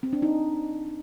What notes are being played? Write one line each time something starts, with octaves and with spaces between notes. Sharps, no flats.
C4
D4
D#4